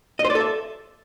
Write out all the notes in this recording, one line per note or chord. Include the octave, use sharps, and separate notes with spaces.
D#5
C5
D5
A4
E5